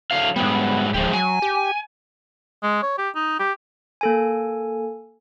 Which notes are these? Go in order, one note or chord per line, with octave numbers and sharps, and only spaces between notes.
D3 F#3 F5
G#2 F#3 G3 B3
D1 F3 G#3 G4
F#3 G#5
G4
G#3
C#5
G4
D#4
G4
A#3 A4 G#5